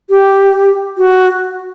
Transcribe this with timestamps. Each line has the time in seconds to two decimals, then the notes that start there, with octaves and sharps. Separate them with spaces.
0.10 G4
0.98 F#4